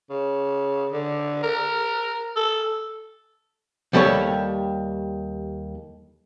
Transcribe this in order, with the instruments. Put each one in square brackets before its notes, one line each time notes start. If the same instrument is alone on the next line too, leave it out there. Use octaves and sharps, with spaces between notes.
[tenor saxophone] C#3
D3
A#4
A4
[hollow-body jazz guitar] D#2 G3 G4 A4 C#5